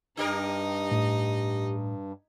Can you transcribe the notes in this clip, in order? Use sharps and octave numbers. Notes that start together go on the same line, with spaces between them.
G2 D4 D#4 G4 A#4 D#5
A2